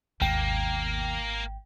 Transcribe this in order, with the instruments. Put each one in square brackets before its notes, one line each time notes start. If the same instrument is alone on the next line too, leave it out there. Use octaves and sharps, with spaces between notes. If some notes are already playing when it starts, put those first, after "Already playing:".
[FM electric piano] G#1 G5 [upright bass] D#2 B2 [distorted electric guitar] A#3